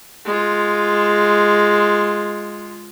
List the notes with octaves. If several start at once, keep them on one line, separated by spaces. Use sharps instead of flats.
G#3 F4